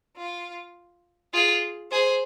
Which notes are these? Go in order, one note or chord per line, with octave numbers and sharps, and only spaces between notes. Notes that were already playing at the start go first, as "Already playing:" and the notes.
F4
F4 G#4
G#4 C5